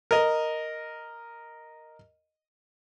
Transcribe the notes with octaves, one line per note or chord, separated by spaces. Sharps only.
A#4 D#5